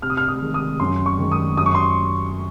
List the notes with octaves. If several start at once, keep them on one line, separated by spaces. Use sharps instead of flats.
C3 F6
D#6
F6
D#6
D#3 G#3
D#6
F#2 C6
C#6
D#3 G#3
D#6
F#2 D#6
C#6
C6